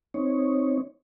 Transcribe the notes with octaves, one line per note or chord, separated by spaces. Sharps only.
C4 D#4 C#5